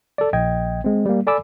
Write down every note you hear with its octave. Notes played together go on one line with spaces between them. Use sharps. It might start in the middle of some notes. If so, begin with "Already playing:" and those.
A4 D5
A#1 D#5 G5 G#6
G#3 C4
G3 A#3
A4 D5 G#5 B5 D6 E6